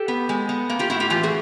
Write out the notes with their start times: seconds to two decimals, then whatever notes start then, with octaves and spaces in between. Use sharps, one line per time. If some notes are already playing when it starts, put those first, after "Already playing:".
Already playing: G4 A4
0.08 B3
0.29 G#3
0.49 B3
0.69 A#3
0.79 F4 G4
0.90 A2 E4 F#4
1.00 F4 G4
1.10 E3 F4 G4
1.23 F#4 G#4